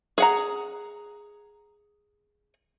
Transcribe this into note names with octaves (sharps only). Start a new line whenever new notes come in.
G#4 F#5 A#5